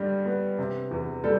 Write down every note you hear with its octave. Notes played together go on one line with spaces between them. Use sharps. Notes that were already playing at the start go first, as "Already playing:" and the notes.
Already playing: G2 D3 G3
B3
C3
E2
G3 A4